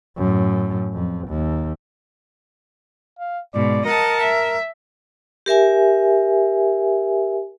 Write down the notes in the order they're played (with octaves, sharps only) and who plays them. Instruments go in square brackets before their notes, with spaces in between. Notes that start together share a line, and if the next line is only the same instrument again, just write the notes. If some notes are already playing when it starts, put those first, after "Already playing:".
[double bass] F#2 A2
F2
D#2
[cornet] F5
[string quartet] G#2 B2 [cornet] D5
[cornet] A#4 [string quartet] D#5 F#5 A5
[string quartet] E5
[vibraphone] G4 A#4 E5 G#5